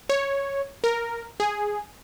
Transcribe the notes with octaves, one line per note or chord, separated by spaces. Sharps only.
C#5
A#4
G#4